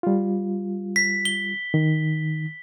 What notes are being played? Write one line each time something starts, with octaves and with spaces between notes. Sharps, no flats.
G3 F4
B6
G7
D#3